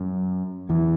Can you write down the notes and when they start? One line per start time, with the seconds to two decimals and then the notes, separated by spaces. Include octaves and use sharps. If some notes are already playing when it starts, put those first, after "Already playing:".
Already playing: F#2
0.69 E2 E3